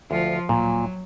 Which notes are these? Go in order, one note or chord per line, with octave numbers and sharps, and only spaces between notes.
D2 F3 F4
D1 A#2 F#3